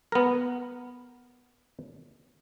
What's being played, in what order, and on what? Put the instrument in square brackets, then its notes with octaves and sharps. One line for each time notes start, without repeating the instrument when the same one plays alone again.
[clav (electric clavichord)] B3 A#4